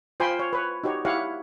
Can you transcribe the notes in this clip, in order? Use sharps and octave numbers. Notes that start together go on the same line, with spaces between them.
F4 C5 G5 G#5 B5 C6
C#5
B4 C#5
D#4 F#4 G4 C#5
E4 G4 C#5 F5 F#5